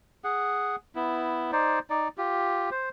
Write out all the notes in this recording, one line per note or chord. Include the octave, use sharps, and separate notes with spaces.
G#4 F#5
B3 E4
D#4 C5 D5
D#4 D5
F4 G4
C5